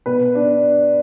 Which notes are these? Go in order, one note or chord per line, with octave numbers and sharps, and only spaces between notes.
B2 B4
D4